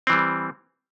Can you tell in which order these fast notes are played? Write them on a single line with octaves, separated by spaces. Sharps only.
C4 E3 G3